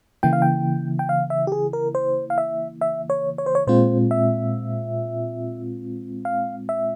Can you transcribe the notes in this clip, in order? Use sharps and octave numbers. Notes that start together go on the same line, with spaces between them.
C#3 E3 A#3 E4 G5
F5
G5
G5
F5
E5
G4
G#4
A#4
C5
F5
E5
E5
C#5
C#5
C5
C#5
A#2 G#3 C4 F4 C5
E5
F5
E5